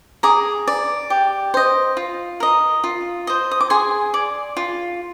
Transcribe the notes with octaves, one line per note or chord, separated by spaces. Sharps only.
G#4 A#5 D6
D5
G4
C5 D#5
F4
A#4 D#5
F4
C5 D#5
D#6
D6
G#4 G#5 C6
D5
F4